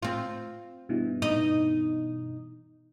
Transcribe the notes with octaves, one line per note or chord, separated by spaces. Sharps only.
C4 F4
G2 B2 E3
D#4 D#5